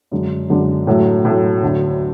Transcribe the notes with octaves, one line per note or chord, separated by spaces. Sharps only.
F#2 D3 G#3 D4
F#2 D3 G#3 D4
A2 F#3 A3
A2 F#3 A3
D2 D3 F#3